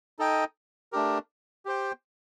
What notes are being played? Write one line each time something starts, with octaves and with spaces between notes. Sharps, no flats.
D#4 A4 D#5 G5
A3 D4 G4 A#4
G4 C5 G5